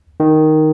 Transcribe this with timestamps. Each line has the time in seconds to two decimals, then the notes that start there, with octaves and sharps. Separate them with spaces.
0.20 D#3